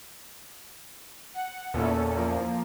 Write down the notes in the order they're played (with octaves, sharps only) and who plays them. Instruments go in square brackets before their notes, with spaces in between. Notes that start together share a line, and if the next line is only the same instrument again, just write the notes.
[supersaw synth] F#5
[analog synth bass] E2 [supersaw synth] A#2 C#4 A4
[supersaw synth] F3 A#3